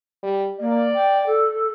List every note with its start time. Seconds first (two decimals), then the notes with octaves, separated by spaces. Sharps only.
0.23 G3
0.60 A#3 D5
0.95 G5
1.27 A4